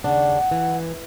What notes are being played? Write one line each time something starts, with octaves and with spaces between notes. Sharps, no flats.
D#2 C#3 D4 F#5
E3